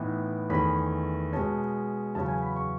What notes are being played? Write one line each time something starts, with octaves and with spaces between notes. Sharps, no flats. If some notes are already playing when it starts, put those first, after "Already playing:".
Already playing: A2 E3 B3 D#4
E2 D#3 A3 C#4 B5
B2 G#3 C#4 A5
E2 C#3 F#3 C#4 A5
G#5
B5
C#6